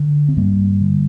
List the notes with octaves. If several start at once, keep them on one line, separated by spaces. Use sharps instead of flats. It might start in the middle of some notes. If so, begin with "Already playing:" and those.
Already playing: D3
C4
G2 G3 A#3
D3